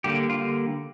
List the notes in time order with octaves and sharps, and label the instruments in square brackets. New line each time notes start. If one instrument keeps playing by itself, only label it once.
[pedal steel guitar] D3 G3 A#3 G4
F4